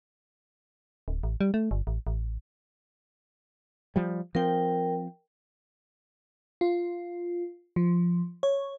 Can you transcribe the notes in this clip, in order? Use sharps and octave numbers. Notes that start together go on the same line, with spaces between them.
D1
A1
G3
A3
G1
A1
A1
F3 G3
F3 C4 A#4 G5
F4
F3
C#5